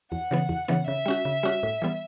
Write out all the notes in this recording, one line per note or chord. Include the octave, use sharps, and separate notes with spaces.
E2 F#5
C#3 E3 B3
E2
C#3 E3 B3
C#3 E5
G3 C#4 F#4
C#3
G3 C#4 F#4
A2
E3 G3 B3